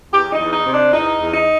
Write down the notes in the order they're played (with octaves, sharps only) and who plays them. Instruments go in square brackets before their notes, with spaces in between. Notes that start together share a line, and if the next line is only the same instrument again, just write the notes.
[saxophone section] E2 G4
D#4
E2
D#4
C3
D4
E2 D#4
E2
D#4